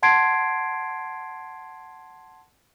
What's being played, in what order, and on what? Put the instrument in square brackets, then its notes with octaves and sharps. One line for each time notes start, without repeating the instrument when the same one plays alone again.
[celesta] F#5 A5 C6 G#6 C7 D7